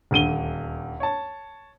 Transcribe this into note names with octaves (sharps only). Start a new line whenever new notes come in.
D#1 D2 D#7 G7
C#5 A5